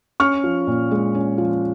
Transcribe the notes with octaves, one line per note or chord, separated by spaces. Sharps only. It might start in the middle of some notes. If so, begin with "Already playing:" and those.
C#4 C#6 F6
F3
A#2
G#3
C#4
F3